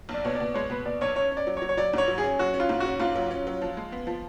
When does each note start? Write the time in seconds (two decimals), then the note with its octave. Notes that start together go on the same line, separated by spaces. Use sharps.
0.09 B1
0.14 D5
0.25 B2 C#5
0.35 D5
0.40 B2
0.54 G#3 C#5
0.70 B2 B4
0.85 B2 D5
1.01 B1 C#5
1.16 C#4 C#5
1.31 C#4
1.37 D5
1.47 F#3
1.57 C#5
1.62 F#3
1.69 C#5
1.77 F#3 D5
1.93 G#2 C#5
2.08 F#3
2.18 G#4
2.24 C#4
2.39 F#3 F#4
2.54 C#4
2.60 F4
2.69 G#2
2.80 C#4 F#4
3.00 G#2 F4
3.15 F#3
3.31 C#4
3.47 F#3
3.62 F3
3.77 G#3
3.92 B3
4.07 F3